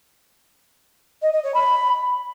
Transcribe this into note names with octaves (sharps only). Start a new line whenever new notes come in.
D#5
D#5
C#5
B5